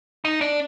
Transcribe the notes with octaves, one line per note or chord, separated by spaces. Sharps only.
D#4
D4